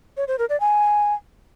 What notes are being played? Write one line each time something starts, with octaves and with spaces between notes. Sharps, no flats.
C#5
C5
A#4
D5
G#5